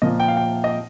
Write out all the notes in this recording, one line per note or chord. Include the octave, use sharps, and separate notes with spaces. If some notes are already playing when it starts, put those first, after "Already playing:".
A#2 F3 A#3 D#5
G5
F5
G5
D#5